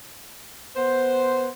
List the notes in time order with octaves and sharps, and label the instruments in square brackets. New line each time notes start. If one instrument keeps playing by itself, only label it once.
[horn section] B3 C5